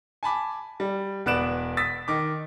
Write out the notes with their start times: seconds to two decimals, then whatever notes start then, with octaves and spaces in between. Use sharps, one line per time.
0.23 G#5 A5 B5 D6
0.80 G3
1.26 E1 B3 D5 F#6 D7 E7
1.77 D#6 E6 A6 B6
2.08 D#3 D6